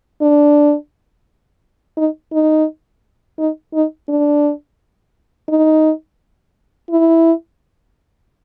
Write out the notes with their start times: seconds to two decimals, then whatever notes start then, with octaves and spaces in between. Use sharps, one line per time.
0.22 D4
1.97 D#4
2.33 D#4
3.39 D#4
3.74 D#4
4.09 D4
5.49 D#4
6.90 E4